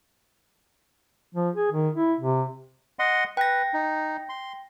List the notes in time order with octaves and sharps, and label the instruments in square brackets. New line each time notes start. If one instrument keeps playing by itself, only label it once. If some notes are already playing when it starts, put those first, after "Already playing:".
[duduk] F3
G#4
D#3
E4
C3
[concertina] D#5 F#5 C6
[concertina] B4 [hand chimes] G5 A#6
[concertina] D#4
C6